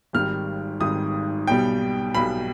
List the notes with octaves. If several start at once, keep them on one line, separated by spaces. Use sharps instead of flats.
G#1 G#2 D#3 G3 F6
G#1 G#2 D#3 G3 D#6
B1 B2 G3 G5
B1 B2 G3 B5